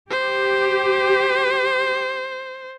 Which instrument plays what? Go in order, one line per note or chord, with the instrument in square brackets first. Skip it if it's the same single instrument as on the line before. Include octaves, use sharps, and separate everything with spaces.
[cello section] G4 [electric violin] C5